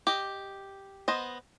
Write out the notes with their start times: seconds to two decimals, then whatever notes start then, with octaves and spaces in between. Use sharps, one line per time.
0.07 G4 D#5
1.08 B3 C5 D#5